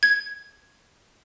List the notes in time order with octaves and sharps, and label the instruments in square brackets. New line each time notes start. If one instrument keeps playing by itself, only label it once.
[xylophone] G#6